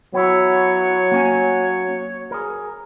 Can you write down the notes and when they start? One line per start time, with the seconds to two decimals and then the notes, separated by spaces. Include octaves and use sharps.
0.14 F#3 B3 E4 C#5
1.12 A#3 C#4 G#5
2.31 G#4 A#4